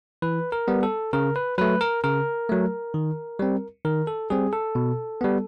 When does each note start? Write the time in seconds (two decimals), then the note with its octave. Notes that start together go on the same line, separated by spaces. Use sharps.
0.22 E3 B4
0.52 A#4
0.68 G3 B3
0.83 A4
1.13 C#3 A#4
1.36 B4
1.58 F#3 A3 B4
1.81 A#4
2.04 C#3 A#4
2.49 F#3 A3
2.94 D#3
3.39 G3 C4
3.85 D#3 A#4
4.07 A4
4.30 G3 C4 G#4
4.53 A4
4.75 B2
5.21 G3 B3